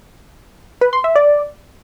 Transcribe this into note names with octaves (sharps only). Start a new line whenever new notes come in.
B4
C6
E5
D5